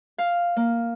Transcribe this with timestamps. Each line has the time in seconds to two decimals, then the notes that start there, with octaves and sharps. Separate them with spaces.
0.18 F5
0.57 A#3